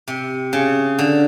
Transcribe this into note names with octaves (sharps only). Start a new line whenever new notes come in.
C3
C#3
D3